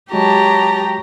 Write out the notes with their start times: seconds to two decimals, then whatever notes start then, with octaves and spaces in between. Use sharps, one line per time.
0.12 F#3 G#3 F#4 G4 C#5 A5 A#5